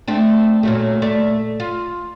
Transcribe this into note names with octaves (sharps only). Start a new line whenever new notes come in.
A3 C4 D4
A#2 F#3 A3
A3 D5
F4